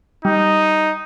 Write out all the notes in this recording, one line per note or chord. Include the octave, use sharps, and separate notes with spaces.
G3 D#4